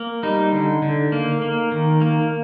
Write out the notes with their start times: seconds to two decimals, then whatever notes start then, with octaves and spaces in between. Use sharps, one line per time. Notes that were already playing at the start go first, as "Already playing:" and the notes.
Already playing: A#3
0.23 G3 D#4
0.52 D3
0.82 D3
1.12 A#3
1.42 A#3
1.72 D#3
2.01 A#3